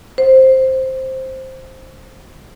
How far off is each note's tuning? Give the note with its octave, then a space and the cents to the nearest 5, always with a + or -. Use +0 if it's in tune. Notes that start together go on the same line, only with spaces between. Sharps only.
C5 +5